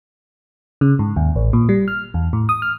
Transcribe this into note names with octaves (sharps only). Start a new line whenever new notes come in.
C#3
G#2
D#2
A1
A#2
G3
F6
E2
A2
D#6
F6